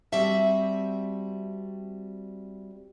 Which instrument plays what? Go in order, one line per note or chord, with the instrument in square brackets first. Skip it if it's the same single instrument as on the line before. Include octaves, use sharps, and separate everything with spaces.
[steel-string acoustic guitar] G3 C4 F#4 E5 A5